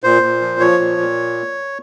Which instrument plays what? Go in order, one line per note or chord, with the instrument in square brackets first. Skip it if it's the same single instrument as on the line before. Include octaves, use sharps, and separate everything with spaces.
[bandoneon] A#2 C5
A#2
F3
F3 C#5
A#2
A#2